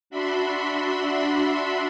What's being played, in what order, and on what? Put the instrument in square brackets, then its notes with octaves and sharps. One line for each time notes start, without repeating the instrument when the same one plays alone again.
[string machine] D4 F#4 E5 B5 C6